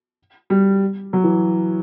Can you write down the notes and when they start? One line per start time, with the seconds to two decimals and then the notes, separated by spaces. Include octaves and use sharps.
0.50 G3
1.13 F#3
1.24 E3